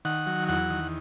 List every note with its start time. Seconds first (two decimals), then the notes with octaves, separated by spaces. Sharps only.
0.05 D#3 F#5
0.27 F#3
0.48 E2 F#5
0.70 D#3